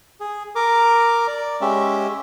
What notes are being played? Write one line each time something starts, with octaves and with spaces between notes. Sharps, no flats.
G#4
A#4 A#5 D6
D5
G#3 C#4 G4 E5